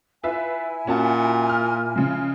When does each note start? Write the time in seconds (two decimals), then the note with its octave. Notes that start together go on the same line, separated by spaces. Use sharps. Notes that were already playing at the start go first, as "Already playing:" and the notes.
0.23 E4 F4 B4 E5 G#5
0.87 A#2 C#4 F#4 A5
1.49 F6
1.96 C#3 F3 G#3